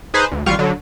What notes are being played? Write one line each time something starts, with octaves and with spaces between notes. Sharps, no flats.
D#4 G#4 B4 C5
D2
A1 G3 F4 F5 C#6
D3 F#3